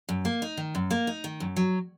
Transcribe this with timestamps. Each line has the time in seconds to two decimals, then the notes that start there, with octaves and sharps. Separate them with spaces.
0.09 F#2
0.25 A#3
0.42 D#4
0.57 D#3
0.75 F#2
0.91 A#3
1.07 D#4
1.24 D#3
1.40 F#2
1.56 F#3